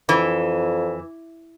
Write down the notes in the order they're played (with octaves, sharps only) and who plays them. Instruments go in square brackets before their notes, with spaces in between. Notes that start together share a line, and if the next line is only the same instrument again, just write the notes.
[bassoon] F2 [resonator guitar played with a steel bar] E3